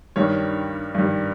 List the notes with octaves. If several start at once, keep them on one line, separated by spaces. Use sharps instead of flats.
G2 D#3 G3 C#5
G2 D#3 G3